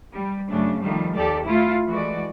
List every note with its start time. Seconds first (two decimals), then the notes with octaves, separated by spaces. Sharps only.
0.14 G3
0.49 F#2 C#3 A3 D4
0.82 D#3 F3 G3 A3
1.16 D#2 G4 A4 D5
1.46 A3 E4 F4
1.89 E3 G#3 A3 F#4 D5